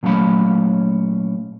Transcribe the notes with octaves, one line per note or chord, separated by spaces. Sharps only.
A#2 F#3 A3 C#4 F5 B5